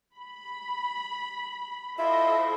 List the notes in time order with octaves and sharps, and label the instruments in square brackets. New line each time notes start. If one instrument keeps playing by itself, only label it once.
[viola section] B5
[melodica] E4 F4 [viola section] A4 C5 D#5 [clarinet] E5